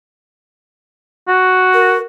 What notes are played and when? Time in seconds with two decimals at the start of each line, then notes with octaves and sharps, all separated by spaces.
1.28 F#4
1.74 A#4